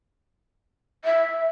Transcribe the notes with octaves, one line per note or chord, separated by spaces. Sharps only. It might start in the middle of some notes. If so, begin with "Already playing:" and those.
E5